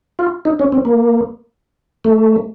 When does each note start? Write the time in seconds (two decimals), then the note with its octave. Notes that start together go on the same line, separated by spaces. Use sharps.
0.19 F4
0.45 D#4
0.59 C#4
0.72 C4
0.85 A#3
2.04 A3